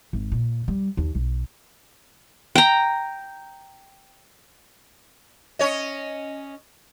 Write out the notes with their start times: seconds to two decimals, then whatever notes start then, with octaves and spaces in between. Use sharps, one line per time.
0.13 G#1
0.32 A#2
0.68 G3
0.97 D#2
1.15 B1
2.55 G5 A#5
5.59 C#4 C#5 D#5